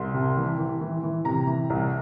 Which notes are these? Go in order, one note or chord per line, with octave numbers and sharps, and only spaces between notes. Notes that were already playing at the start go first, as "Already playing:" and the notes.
Already playing: C2 C6
C3
E3
E3
E3
E3
C3 A#5
E3
C2